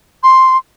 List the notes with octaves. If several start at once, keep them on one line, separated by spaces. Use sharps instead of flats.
C6